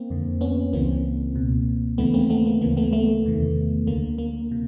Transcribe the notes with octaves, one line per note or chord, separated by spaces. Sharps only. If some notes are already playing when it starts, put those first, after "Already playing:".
Already playing: A#3 C4
F2 D3
B3 C#4
C#2 C#3 E3 A#3 C4
C#2 B2
D#2 C#3 E3 A3 B3
A#3 C4
A3 B3
A#3
D2 C#3 E3 A#3
A3 B3
A3 B3
E2 C3 D#3
D2 D3 A#3
A#3
C3